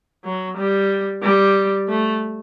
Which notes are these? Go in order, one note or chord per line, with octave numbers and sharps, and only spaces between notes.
F#3
G3
G3
A3